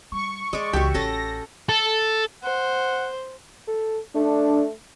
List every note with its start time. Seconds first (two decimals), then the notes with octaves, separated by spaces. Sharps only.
0.12 G3 C#6
0.53 E3 G#3 D5
0.73 C#2 E3 F#4 G4 E5
0.94 A1 C#4 A4 A5 A#6
1.69 A4
2.43 C5 F#5
3.67 A4
4.15 A3 D4